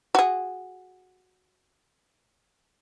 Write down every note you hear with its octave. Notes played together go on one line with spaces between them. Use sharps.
F#4 G#4